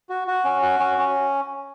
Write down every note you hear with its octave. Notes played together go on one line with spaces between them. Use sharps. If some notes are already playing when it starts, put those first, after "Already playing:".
F#4
F#4
C#4
F#4
C#4
C#4